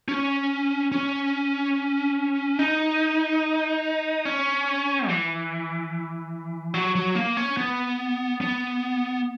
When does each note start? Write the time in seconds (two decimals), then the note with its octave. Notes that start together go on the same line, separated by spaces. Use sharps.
0.08 C#4
0.92 C#4
2.59 D#4
4.25 C#4
5.08 E3
6.74 F#3
6.95 F#3
7.15 A#3
7.37 C#4
7.57 B3
8.41 B3